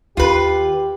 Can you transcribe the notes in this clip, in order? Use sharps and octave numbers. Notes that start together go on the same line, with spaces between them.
D#2 F4 G4 B4